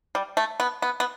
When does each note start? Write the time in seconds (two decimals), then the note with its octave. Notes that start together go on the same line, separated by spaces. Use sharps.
0.15 G3
0.37 A3
0.60 B3
0.82 B3
1.00 B3